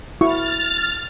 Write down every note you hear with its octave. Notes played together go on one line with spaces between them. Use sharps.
E4 F#4 C#6 F6 A6